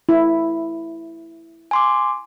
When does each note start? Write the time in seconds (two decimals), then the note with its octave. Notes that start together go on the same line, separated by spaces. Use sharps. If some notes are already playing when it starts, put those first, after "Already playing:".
0.09 E4
1.71 G#5 C6 D6